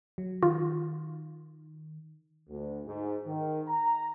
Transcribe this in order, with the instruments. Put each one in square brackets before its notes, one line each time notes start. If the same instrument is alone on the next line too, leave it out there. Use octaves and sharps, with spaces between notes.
[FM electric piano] F#3
[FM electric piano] D#3 [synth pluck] F4
[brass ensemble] D2
G#2
D#3
A#5